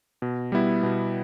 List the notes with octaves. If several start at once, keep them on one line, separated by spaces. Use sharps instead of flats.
B2
G3 B3 E4
B2